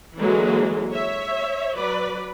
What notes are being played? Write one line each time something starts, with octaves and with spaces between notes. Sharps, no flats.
D3 E3 F#3 G#3 A#3
C#5 E5
F#3 B4 D5